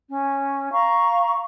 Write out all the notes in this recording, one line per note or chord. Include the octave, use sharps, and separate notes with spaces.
C#4
F5 A#5 C#6